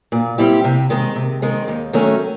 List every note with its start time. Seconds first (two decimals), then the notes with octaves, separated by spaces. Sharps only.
0.12 A#2
0.38 G3 C4 E4 G4
0.64 C3
0.90 D#3 G#3 C4
1.16 C3
1.42 D#3 G#3 C4
1.68 D#2
1.93 D#3 F#3 A3 C#4